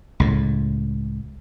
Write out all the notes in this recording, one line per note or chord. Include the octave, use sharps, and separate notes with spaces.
C#2 A2